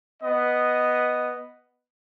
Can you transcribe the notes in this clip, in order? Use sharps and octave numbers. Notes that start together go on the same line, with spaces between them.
B3 D#5